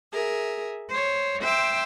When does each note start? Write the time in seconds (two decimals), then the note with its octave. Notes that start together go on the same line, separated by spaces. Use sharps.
0.11 G#4 A#4 E5
0.89 C5 C#5
1.41 C5 E5 G5 C6 D6